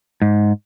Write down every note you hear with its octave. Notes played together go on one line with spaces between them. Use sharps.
G#2